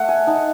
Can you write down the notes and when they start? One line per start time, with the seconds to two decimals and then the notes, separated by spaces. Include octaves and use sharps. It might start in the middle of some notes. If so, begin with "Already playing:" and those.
Already playing: A3 F#5
0.09 G#5
0.27 D#4 A5